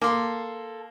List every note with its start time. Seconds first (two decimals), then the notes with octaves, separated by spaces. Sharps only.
0.02 A#3 A4 C6 D6